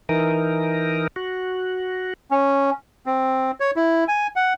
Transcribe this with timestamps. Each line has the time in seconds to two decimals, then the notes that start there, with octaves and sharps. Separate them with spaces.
0.09 E3 D#4 A#4
1.16 F#4
2.31 C#4
3.06 C4
3.60 C#5
3.76 E4
4.08 G#5
4.36 F#5